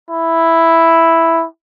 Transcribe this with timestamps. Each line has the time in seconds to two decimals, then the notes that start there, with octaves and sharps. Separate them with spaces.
0.10 E4